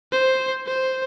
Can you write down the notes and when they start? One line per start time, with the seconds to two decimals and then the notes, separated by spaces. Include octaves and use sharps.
0.12 C5
0.66 C5